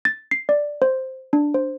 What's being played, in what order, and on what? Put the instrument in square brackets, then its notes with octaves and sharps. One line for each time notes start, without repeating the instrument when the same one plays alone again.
[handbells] A6
C7
D5
C5
D4
C5